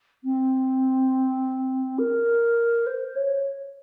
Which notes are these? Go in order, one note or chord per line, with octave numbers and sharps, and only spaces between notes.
C4
A#4
C5
C#5